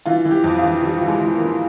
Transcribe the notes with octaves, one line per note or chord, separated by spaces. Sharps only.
E3 F4
E3
G4
F2
F4
E3
E3 G3
E3
G#3
E3
A#3
E3